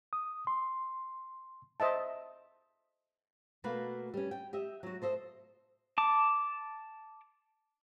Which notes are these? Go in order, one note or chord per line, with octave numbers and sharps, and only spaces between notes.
D#6
C6
C5 D#5 E5 A5
B2 A3 A#3 F#4 A#4 B4
G3 C#4
G5
G4 D#5 E5
F#3 F#4
A4 C5 D#5 E5
A5 D6